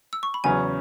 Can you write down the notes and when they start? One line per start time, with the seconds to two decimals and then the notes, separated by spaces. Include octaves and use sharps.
0.13 E6
0.23 C#6
0.34 B5
0.44 E2 C#3 F#3 C#4 G#5